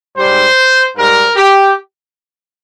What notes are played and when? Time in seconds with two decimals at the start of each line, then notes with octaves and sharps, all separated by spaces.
0.17 G#2 G3 C5
0.97 G#2 G3 A#4
1.36 G4